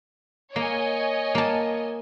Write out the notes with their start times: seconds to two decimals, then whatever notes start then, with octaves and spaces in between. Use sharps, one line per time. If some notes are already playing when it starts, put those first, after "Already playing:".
0.56 A#3 C#5 D#5 G#5
1.35 A#3 A5